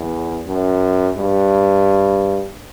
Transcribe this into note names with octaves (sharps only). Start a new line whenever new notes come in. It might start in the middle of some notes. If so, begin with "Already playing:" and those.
Already playing: E2
F#2
G2